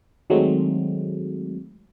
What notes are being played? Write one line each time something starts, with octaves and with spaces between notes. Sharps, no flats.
D#3 F#3 G#3 A3 C4